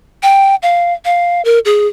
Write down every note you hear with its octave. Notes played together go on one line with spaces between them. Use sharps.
G5
F5
F5
A#4
G#4